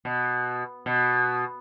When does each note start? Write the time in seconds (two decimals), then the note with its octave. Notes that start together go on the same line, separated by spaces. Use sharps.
0.05 B2
0.86 B2